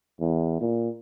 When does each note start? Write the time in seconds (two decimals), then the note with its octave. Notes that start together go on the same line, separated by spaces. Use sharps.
0.21 E2
0.61 A#2